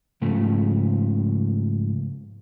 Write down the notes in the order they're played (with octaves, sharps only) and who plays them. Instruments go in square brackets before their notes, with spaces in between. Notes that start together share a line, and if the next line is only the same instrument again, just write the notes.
[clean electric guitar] G#2 C#3 F3 A3